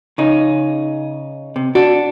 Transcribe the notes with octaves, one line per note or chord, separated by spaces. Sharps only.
C#3 D#4
C3
D4 F#4